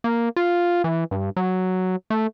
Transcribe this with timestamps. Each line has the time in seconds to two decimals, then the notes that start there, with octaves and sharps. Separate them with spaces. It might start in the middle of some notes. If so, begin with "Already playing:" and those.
0.04 A#3
0.36 F4
0.84 E3
1.11 G2
1.36 F#3
2.10 A3